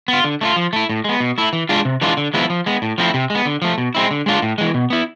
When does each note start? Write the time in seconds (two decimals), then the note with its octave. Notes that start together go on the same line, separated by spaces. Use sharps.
0.08 B3 F4
0.24 D3
0.41 A3 D4 F4
0.56 F3
0.73 A3 E4
0.89 A2
1.04 G#3 B3
1.20 B2
1.38 A3 E4
1.53 E3
1.69 G#3 D4 F4
1.85 C3
2.01 E3 G#3 D4 F4
2.17 D3
2.34 F3 G#3 B3 E4
2.50 F3
2.66 G#3 B3
2.82 A2
2.98 F3 A3 C4 E4
3.14 C3
3.30 G#3 B3
3.46 D3
3.62 F3 A3
3.78 B2
3.95 G#3 C4 E4
4.11 D3
4.26 G#3 D4 F4
4.42 A2
4.58 E3 G#3
4.74 B2
4.90 B3 E4